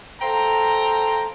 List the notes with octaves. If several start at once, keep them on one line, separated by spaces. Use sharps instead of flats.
A4 C5 F5 G5 A#5